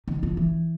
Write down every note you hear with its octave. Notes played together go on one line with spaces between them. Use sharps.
D#3
F3
E3